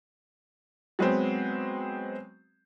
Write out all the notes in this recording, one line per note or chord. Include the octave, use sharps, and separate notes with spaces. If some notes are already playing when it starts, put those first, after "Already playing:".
F#3 G#3 B3 C4